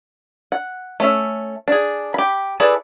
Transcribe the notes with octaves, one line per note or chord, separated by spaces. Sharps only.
F#5
A3 C#4 E5
D4 G#4
G4 B5
E4 G#4 A4 B4 D5